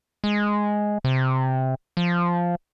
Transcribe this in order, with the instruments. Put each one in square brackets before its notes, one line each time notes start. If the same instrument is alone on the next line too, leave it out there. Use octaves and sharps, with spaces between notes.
[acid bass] G#3
C3
F3